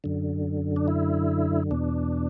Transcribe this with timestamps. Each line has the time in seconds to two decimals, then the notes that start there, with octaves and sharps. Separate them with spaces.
0.04 F#2 D3
0.76 D4
0.88 E4
1.71 E2 B2 D4